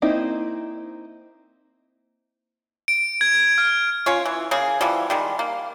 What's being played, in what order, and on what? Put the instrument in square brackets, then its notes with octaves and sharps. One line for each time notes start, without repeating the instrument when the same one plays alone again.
[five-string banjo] A#3 C4 D#4 E4
[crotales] D7
G#6
F6
[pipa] C#4 F4 C#5
E3
C#3 A#3 G#4
E3 F3 G3
D#3 G3 G#3
A#3